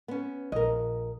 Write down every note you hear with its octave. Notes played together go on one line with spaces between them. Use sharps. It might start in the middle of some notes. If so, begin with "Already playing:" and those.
B3 C#4
A#1 A#4 D#5